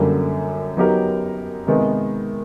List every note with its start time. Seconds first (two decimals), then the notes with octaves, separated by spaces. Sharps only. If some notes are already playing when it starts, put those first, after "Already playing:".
Already playing: F#2 D3 G3 A#3
0.77 F#3 B3 D#4 G4 A#4
1.67 C3 D#3 G#3 B3 D#4